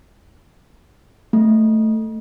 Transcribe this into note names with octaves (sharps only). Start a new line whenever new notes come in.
A3